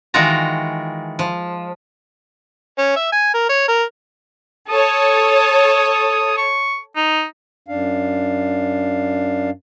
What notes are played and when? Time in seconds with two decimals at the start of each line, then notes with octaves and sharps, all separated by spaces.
0.14 D#3 E3 G#3 F4 F#4 A#5
1.19 F3
2.79 C#4
2.96 E5
3.12 G#5
3.34 A#4
3.49 C#5
3.68 A#4
4.69 A4 C#5 D#6
6.38 C#6
6.96 D#4
7.68 F#2 D4 F5